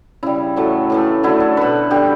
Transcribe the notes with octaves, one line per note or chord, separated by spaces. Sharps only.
C#3 G3 E4
A2 F#3 A3
A2 E3 A3
D3 F#3 A3 E4
A4
B2 A3 B4
D3 G3 G4